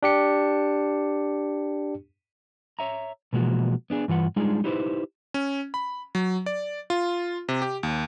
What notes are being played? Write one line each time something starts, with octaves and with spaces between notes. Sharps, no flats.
D4 G4 C#7
C#5 E5 A#5
B2 E3 F3 G#3 A#3 F#4
B3 D4 G#4
G2 E3 F4 F#5
G3 G#3 D4 D#4 F4 G#4
D#4 E4 G4 B4 C5
C#4
B5
F#3
D5
F4
C3
G4
D#2